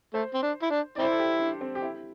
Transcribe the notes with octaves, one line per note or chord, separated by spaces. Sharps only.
A3 C5
C4
D4
E4
D4
C4 E4 D5
C5
A4
G4
D4
C4
G4
E4